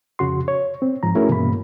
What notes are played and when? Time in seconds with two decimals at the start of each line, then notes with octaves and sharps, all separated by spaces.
0.19 F2 C#3 F#4 C6
0.48 C#5
0.82 C4
1.03 G#2 F3 A#5
1.15 A3 C#4 E4 F#4 G#4 A#4
1.29 G2 B2 E3 A#3 B5